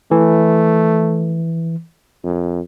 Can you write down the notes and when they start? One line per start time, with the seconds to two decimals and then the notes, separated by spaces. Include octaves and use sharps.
0.11 E3 A3
2.24 F2